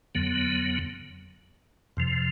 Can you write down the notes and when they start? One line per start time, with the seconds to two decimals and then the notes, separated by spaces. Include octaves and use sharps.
0.15 F2 D3 F#3 B3
1.97 F2 C3 F3